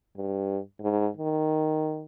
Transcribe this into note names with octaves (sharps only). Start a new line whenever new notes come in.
G2
G#2
D#3